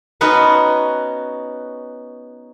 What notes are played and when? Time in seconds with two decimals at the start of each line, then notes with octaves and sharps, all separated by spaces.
0.21 B3 C#4 D#4 F#4 B4